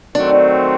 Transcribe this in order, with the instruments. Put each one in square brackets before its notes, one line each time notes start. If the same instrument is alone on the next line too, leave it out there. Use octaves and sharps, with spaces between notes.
[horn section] D#3 F#3 A3 C4 [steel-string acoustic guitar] D4